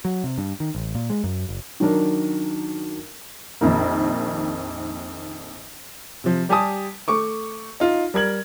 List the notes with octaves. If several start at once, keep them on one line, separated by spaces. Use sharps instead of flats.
F#3
C3
G2
D#3
A1
A#2
G#3
F#2
F#1
D#3 F#3 D4 A#4
A#1 F2 D#3 A#3
C3 F3
G3 G4 G#5 A5 D#6
A3 C#6 D6
D#4 F4
G3 A#4 G#6 F#7